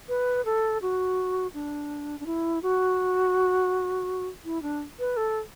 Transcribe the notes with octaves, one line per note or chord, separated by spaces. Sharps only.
B4
A4
F#4
D4
D4
E4
F#4
E4
D4
B4
A4